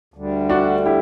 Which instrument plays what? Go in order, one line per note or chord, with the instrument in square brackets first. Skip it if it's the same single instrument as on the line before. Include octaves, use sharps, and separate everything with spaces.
[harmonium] D2 D3 G3
[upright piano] D4 F#4
E4 G4